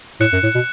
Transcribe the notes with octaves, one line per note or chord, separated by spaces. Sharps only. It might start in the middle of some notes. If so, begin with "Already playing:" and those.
A2 F#6 C#7 E7
F#2
A2
B2